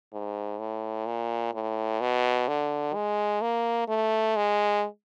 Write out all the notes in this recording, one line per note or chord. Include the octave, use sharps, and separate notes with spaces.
G#2
A2
A#2
A2
B2
D3
G#3
A#3
A3
G#3